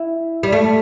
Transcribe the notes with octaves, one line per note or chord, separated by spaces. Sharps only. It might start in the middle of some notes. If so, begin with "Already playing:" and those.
Already playing: E4
G3
A3